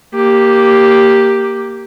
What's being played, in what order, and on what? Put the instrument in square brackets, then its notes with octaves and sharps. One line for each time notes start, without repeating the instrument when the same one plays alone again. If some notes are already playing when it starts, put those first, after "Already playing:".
[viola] A#3 G4